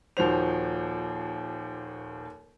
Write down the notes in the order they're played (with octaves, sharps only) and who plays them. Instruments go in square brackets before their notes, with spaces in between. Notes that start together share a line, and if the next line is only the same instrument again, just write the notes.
[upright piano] D#1 D#2 F3 F#4 C5 F7